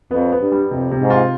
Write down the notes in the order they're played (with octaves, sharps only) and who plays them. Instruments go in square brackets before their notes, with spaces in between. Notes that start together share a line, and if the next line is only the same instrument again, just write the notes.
[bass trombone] F2 [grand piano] B3
[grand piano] B3
[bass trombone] G2
[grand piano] G3
[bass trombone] F2 [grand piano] C3
[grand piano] C3
[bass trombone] G#2
[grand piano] F4